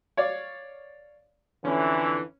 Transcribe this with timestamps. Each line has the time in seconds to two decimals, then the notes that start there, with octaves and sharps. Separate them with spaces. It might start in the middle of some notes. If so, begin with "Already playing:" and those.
0.17 C#5 D5 F5
1.65 F2 D3 E3 C#4